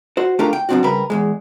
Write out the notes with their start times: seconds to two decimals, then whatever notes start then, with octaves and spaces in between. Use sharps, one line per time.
0.17 F#4 C5
0.39 A3 D4 F4 G4 A#4
0.53 G5
0.69 F#2 B2 A#3 C4 D4 F#4
0.84 C#3 G3 A#4 B4 B5
1.10 E2 G2 G#3